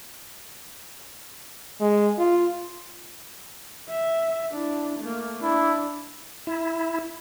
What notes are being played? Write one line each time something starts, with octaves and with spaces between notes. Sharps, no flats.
G#3
F4
E5
D4 E4
A3 A#3
D4 E4
E4